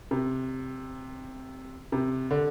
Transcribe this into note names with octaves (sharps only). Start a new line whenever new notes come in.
C3
C3
D3